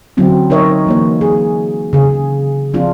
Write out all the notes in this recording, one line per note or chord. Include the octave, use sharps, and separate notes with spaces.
D3 F#3 C4 C#4 E4
D#4 A#4 C#5 D#5 E5
E3 A#3 C#5
G#4
C#3 G#4
F3 C4 D4 F4